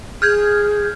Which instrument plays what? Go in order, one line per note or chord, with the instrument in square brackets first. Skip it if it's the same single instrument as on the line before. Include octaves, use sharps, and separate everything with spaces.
[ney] G#4 [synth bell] F6 G6 G#6